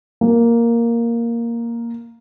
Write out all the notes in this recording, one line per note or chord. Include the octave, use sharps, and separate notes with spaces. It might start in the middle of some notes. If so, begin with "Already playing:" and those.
A#3